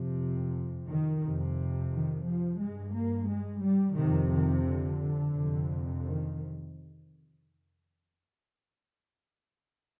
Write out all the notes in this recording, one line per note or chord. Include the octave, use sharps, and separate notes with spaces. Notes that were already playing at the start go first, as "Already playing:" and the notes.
Already playing: F2 C3
D#3
F2 C3
D#3
F3
G2 G#3
A#3
G#3
G3
F2 C3 D#3
D#3
D3
F2 C3
D#3